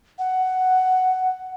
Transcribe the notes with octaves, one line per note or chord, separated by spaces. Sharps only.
F#5